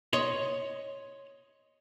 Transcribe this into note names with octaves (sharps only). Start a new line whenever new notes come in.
C#5 D#5 C6